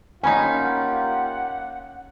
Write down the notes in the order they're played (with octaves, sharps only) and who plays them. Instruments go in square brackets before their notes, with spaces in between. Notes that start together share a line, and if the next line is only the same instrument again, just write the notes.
[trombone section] A#3 F4 G4 [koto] C#4 D#4 [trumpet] F#5 [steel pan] G#5 B5